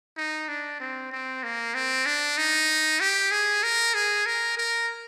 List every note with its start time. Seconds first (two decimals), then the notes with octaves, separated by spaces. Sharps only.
0.17 D#4
0.48 D4
0.80 C4
1.12 C4
1.43 A#3
1.74 C4
2.06 D4
2.37 D#4
3.00 G4
3.31 G#4
3.63 A#4
3.94 G#4
4.26 A#4
4.57 A#4